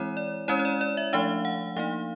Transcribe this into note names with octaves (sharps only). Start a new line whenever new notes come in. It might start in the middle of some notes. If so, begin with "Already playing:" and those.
Already playing: E3 G#3 C4 E4 C#5
D5
G#3 C#4 E4 C#5
C#5
D5
D5
E5
F3 A3 D4 F5
F#5
F3 A#3 D#4 F5